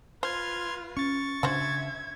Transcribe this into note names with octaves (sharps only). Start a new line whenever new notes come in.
F4 B4 C5 C6 F6 G#6
C#4 C#6 A6
C#3 C#4 D4 F#4 C5 E5 G#6